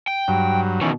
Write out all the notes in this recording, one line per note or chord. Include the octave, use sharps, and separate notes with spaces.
G5
G2 F#3
B2 D#3 E3 C#4